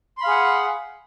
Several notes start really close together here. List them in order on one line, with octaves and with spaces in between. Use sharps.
C6 B5 F5 G#4 F#5